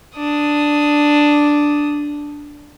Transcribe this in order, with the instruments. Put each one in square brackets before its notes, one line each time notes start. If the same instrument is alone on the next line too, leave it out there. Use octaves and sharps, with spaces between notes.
[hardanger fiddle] D4 D#6